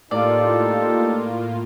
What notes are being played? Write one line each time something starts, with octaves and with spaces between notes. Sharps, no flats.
A2 A#3 D#4 F4 G4 A4 D5